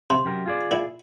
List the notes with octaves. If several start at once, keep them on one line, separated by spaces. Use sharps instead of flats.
C3 C6
F#2 G4 A#4
F4 G#4 D5
A#2 E4